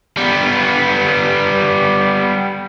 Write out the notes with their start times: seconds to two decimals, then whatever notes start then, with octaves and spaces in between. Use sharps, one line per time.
0.17 G3 B3